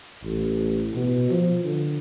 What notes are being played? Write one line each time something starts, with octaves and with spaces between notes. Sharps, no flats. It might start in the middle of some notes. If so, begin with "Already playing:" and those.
A1
B2
F3
D3